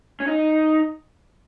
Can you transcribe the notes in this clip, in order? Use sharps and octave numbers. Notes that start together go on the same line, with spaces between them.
C#4
D#4